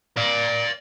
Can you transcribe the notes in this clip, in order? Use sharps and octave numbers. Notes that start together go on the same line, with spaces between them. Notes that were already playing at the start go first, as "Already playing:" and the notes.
D5 F5